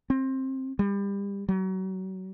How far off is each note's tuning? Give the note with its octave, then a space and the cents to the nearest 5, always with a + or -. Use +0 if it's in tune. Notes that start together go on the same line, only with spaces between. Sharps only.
C4 +20
G3 +30
F#3 +30